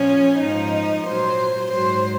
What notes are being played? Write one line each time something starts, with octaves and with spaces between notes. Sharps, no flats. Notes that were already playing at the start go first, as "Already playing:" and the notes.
Already playing: A#2 F3 C#4
G#2 F3 D#4
A#2 F#3 C5
G#2 F#3 C5